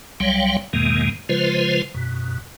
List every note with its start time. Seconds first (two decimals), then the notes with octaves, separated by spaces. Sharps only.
0.20 C2 F#3 G3 C#5 F5 G5
0.73 E2 G#2 B2 D#3 G#3 A#3
1.29 C#3 F3 G#3 F4 B4 C5
1.94 F#2 B2